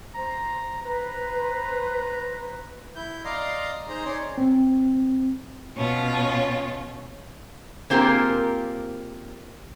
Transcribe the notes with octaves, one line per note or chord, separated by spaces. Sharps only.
C5 A#5
B4 C5 A#5
E4 G6
D5 D#5 F5 A#5 C6
D#4 G#4 C5 D#5 A#5
C#4 D#4 G#4 C#5 D5 C6
C4
B2 C#4 F4
A#3 C4 F4 G4 G#4 A#4